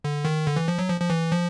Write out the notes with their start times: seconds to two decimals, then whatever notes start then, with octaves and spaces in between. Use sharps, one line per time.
0.04 D3
0.25 D#3
0.46 D3
0.56 E3
0.68 F3
0.78 F#3
0.89 F3
1.00 F3
1.10 E3
1.31 F3